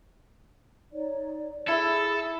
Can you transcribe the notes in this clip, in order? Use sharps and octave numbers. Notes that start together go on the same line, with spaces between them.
D#4 C#5 D5
E4 G#4 A4 E5